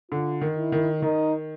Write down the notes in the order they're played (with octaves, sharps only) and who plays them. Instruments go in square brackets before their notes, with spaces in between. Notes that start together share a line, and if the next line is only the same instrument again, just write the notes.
[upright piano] D3 [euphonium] F4
[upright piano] D#3
[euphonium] E4
[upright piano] D#3
[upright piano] D#3 [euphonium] D#4